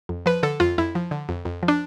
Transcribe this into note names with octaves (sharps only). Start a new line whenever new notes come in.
F2
F3 B4
D3 A4
F2 F4
F2 E4
F3
D3
F2
F2
F3
D4